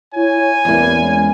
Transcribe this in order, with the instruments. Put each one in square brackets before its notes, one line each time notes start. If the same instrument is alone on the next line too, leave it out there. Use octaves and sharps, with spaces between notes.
[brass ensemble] E4 C#5 [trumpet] G#5
[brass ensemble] A1 G2 E4 [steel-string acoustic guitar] E2 A#3
[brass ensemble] G#3 C#4